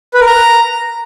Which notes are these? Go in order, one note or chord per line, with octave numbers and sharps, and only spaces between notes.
B4
A#4
A#5